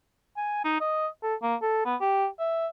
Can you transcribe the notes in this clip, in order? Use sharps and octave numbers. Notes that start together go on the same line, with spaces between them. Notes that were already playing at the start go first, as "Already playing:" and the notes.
G#5
D#4
D#5
A4
A#3
A4
B3
G4
E5